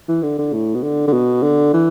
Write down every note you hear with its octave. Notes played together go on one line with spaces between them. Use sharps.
E3
D3
D3
A2
B2
D3
D3
B2
D3
E3